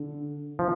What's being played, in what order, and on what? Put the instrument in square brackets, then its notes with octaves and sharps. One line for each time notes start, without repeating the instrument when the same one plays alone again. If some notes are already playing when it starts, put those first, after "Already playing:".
Already playing: [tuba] D3
[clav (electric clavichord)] F3